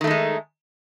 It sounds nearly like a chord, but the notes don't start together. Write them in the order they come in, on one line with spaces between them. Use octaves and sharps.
D#3 A3 D#4 G#3